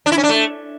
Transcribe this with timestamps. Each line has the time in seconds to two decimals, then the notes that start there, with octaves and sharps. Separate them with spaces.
0.06 D4
0.12 E4
0.18 C#4
0.23 D4
0.29 A3